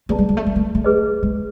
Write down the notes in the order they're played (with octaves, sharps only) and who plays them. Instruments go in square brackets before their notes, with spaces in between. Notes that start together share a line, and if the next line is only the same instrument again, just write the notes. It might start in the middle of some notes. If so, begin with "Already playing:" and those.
[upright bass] A3 [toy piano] G#4 B4 D5 F5 A5
[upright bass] G#3
G#3
A3
G#3
A3
A3
[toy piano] G#4 B4 D#5
[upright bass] G#3